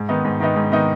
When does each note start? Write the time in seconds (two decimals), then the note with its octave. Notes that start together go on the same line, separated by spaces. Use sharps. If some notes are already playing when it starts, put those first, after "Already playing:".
Already playing: G#2
0.09 D#3 B3 D#4
0.25 G#2
0.40 D#3 B3 D#4
0.56 G#2
0.72 D#3 B3 D#4